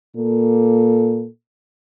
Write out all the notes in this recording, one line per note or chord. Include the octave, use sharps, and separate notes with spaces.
A#2 A#3 A4